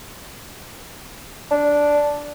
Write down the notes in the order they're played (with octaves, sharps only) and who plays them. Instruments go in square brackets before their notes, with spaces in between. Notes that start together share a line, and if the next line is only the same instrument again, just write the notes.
[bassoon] D4